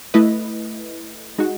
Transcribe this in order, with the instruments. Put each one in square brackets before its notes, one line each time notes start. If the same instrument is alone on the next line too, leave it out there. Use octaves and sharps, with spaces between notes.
[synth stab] A3 E4 B4 D#5
G#3 D#4 F#4